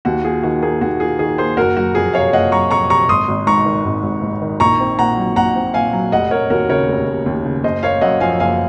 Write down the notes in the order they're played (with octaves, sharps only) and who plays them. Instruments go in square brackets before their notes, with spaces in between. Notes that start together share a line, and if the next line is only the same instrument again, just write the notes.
[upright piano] D#2 [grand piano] F#4
[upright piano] F4 [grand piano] G#4
[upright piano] D#3 [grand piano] F#4
[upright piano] A#3 [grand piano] G#4
[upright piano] D#2 [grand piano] F#4
[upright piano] F4 [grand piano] G#4
[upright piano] D#3 [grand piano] G#4
[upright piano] A#3 [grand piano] G#4 C5
[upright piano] F#1 [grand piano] F#4 A#4
[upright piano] F#3 [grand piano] F#4
[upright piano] F2 [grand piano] G#4
[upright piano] C3 [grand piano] C#5 F5
[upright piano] F#1 [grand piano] D#5 F#5
[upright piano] F#3 [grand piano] A#5 C#6
[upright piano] F2 [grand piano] A#5 C#6
[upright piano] C3 [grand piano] A#5 C#6
[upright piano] G#1 [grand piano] C6 D#6
[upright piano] G#1
[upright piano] G#2 [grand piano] A#5 C#6
[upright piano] D#3
G#1
G#1
G#2
D#3
[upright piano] A#1 [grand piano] A#5 C#6
[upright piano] C4
[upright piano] A#2 [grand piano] F#5 A#5
[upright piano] F#3
[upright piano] A#1 [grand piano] F#5 A#5
[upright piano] C4
[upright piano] A#2 [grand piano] F5 G#5
[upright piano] F#3
[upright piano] F1 [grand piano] D#5 F#5
[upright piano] F1 [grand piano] A#4 C#5
[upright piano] D#2 [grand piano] F#4 A#4
[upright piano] C#3 [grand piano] A#4 C#5
[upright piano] F1
F1
D#2
C#3
[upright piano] F#1 [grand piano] C5 D#5
[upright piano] A#3 [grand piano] C#5 F5
[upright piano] F#2 [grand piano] D#5 F#5
[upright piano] F3 [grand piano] F5 G#5
[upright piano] F#1 [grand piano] F5 G#5